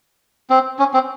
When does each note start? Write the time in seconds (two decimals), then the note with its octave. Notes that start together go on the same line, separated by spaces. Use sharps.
0.50 C4
0.79 C#4
0.94 C4